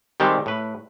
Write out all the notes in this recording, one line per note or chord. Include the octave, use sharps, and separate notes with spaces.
D#3 G3 G#3 C4 G4 A4
A2 B4